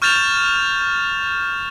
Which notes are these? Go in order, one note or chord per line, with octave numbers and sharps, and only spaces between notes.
C#6 F6 G6 A6 E7 F7